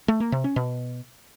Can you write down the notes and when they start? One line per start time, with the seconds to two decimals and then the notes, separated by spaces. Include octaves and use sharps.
0.08 A3
0.20 A#3
0.32 C3
0.44 C#4
0.56 B2